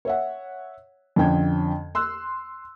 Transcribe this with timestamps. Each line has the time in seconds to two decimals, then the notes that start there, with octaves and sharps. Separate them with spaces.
0.05 C#5 E5 F#5
1.16 F2 D3 C#4 G5 G#6
1.95 C6 E6 F#6